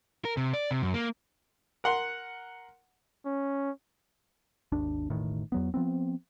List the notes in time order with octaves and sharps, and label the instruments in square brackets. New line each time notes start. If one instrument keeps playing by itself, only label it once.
[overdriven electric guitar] A#4
C3
D5
C3
F#2
A#3
[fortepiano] A#4 F#5 C6
[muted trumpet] C#4
[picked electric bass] G#1 D#2 D4
E1 A1 A2 D#3
E2 F#3 B3
F3 B3 C4